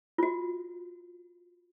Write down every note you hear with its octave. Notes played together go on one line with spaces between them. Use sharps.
F4 F#4